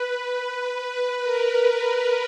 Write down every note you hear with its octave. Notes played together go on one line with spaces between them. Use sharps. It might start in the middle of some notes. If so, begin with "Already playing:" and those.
Already playing: B4
B4
B4
A#4